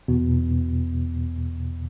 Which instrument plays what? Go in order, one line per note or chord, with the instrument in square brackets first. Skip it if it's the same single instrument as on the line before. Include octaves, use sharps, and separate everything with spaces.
[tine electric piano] E2 B2 B3